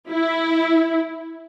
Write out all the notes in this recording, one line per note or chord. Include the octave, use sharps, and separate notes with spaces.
E4